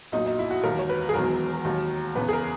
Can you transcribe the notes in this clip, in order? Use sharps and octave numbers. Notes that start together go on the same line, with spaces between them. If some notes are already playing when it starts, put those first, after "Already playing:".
B1 A#2 F#3 D#4
D#4
E4
F#4
E1 D#2 D#3 F#3 A#4
C#5
B4
G#4
E1 E2 D#3 F#3 A#4
D#2 D#3 F#3
E2 C#3 E3 B4
G#4
A#4